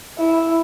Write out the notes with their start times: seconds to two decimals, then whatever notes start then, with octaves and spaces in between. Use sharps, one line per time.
0.18 E4